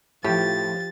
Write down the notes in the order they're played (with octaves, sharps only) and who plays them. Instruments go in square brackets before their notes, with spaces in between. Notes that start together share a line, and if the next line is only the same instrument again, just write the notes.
[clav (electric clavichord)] A2 [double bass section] F3 [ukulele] G4 [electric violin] A6